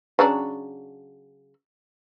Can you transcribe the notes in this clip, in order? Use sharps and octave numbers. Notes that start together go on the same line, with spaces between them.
C#3 F#3 D4